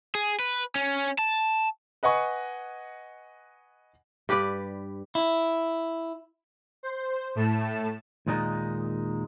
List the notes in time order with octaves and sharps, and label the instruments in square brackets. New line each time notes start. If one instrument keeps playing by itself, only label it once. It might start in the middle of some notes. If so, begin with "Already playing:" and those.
[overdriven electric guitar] G#4
B4
C#4
A5
[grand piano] B4 D#5 F#5 G#5 C#6
[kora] G2 G4 B4 D5
[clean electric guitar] E4
[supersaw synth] C5
A2 A3 A5 E7
[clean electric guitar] D#2 A#2 G#3 D#4